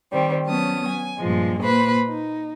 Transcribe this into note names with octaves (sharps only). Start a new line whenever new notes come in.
D#3 G3 C4
F#3 B3 C#4 A5 D#6
G#5
G2 A#2 F3 G#3
A#2 A#3 B4 C5 B5
D#4